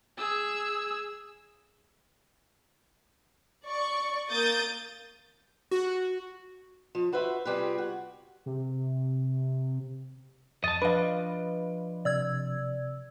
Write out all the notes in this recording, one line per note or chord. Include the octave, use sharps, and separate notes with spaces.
G#4 E6
D5 C#6
A#3 D#6 G6 A6
F#4
F3
F#4 B4 C5 E5
C3 G3 F4 G4 G#4 B4
F#4
C3
F2 D#5 A5 A6
F3 D4 B4 D#5 F5 B5
C3 D5 E6 G#6